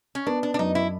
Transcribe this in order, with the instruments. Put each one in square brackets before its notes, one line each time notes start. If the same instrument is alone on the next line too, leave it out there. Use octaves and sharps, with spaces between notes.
[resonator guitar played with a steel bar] C#4
[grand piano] B3 [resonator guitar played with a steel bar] D4
[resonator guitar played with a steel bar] D4
D4
[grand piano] F#2 [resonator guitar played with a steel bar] D#4
[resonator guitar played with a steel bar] E4